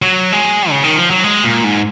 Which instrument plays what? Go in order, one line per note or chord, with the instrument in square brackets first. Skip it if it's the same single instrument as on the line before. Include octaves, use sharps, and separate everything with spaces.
[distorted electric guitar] F#3
G#3
C#3
D#3
F3
F#3
G#3
A#2
G#2